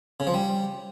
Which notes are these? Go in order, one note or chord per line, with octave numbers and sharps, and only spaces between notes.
C#3
F3
G3